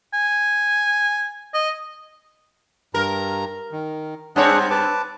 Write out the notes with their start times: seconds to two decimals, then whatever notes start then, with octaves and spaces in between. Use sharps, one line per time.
0.14 G#5
1.54 D#5
2.94 G2 A#4 A#5
3.72 D#3
4.36 G2 C4 D4 G#4 C#5 F#5
4.71 B4 A5 D6